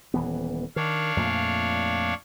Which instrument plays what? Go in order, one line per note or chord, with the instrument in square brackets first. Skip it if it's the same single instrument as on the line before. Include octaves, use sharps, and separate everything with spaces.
[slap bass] D#1 E3 B3
[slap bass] D#3 [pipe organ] D4 C#5 F5
[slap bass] F2 A#2 A3